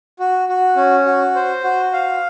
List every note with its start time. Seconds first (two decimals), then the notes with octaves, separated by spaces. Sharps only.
0.19 F#4
0.49 F#4
0.76 C#4
1.05 F#4
1.35 C5
1.64 F#4
1.93 F5